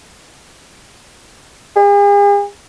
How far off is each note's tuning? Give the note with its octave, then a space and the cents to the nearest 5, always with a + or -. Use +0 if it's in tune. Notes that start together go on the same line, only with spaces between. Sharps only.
G#4 -45